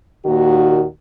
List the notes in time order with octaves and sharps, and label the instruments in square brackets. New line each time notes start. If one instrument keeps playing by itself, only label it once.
[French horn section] D#2 A#2 D#3 F#4